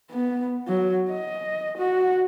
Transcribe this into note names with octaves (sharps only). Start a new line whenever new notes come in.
B3
F#3
D#5
F#4